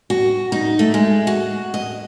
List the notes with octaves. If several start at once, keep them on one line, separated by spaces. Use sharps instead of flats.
F#4
D#4
A3
G#3
F#4
D#5